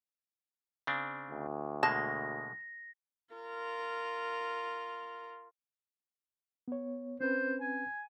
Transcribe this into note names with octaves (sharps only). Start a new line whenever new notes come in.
C#3 C4 D4
D2
B2 G#3 A#3 A5 A#6
F4 A#4
B3 C#5
C4 C#4 B4 C5
G#5